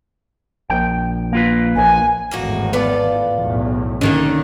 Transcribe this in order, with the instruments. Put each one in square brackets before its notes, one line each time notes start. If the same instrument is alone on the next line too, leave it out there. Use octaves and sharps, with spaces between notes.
[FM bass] A#1 [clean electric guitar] G5
[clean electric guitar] A#3 F4 B4
[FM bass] A#1 [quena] G#5
[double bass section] G#1 E2 A2 [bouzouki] A#3 D#4 F#4
[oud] B3 [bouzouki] F4 A4 D5
[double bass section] B1 E2 A2
[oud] D3 D#3 A#3 [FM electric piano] C#4 [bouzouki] D#5